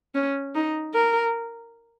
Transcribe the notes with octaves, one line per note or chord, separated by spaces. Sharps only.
C#4
D#4
A#4